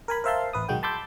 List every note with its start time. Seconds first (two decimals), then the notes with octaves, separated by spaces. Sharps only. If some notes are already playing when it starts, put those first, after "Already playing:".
0.08 A#4 G#5 B5
0.24 A#4 C5 E5 F5 A5 C6
0.53 A1 B4 D#6
0.69 B1 D#3 G#3 F#4 G5
0.83 A5 B5 C6 D6 E6 G6